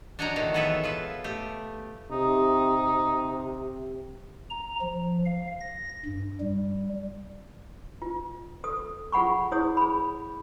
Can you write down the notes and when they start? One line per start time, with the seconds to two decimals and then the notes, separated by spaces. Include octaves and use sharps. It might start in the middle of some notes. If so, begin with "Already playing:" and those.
0.19 D4 F#4 C#5 D#5 G5 A#5
0.36 D#3 E3 A3 F#4
0.54 B3 G#4 A4 B4 C#5 E5
0.83 F4 B4 E5
1.24 A3 G4
2.11 C3 D#4
4.50 A#5
4.81 F3
5.26 F5
5.61 A#6
6.05 G2
6.40 G3
8.02 F4
8.64 A4 D#6
9.12 F4 G#4 F#5 B5 C#6
9.51 E4 G#4 C#5 D#6
9.77 G#4 B5